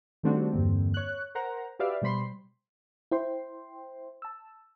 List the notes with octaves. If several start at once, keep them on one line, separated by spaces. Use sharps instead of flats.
D#3 G3 A3 C4 D4 F#4
E2 G2 D3 A#3 C4
C#5 F#6
A#4 C5 F#5 A#5
F#4 G4 B4 D5 E5 F5
B2 G3 C5 B5 C6
E4 C5 G5 C6
A5 E6